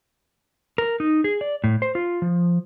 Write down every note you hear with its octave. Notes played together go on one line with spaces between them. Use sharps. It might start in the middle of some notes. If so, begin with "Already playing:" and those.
A#4
D#4
G#4
D5
A2
C5
F4
F3